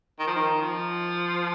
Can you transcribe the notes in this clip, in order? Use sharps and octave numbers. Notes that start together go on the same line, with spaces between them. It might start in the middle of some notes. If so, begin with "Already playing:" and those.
D#3
F3
D#3
F3